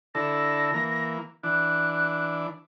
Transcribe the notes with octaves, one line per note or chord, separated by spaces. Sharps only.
D3 E4 A4 A#6
E3 A#3
E3 D4 F#6